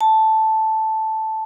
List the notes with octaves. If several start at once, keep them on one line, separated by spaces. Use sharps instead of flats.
A5